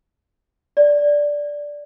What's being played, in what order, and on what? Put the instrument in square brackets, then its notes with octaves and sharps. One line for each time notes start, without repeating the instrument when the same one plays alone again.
[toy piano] D5